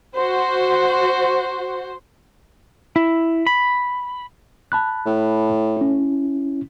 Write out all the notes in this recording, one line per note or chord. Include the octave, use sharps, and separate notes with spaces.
F#4 C5
E4
B5
A5 B5 F#6
A2
C#4 E4